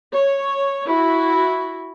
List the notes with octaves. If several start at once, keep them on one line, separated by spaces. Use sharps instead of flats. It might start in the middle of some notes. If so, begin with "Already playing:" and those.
C#5
E4 F#4